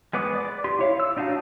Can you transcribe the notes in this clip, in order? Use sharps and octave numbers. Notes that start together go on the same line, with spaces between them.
G#3 B3 B4 D6 D#6
D5 D6
G4 C6
E4 C#5 F5
E6
D4 D#4 F#4 F5 A5